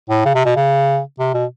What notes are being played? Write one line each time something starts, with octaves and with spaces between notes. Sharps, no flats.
A2
C#3
C3
B2
C#3
C3
B2